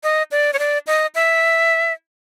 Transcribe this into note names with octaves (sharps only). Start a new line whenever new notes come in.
D#5
D5
C#5
D5
D#5
E5